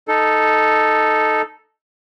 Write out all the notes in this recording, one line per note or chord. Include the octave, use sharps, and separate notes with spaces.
D#4 A4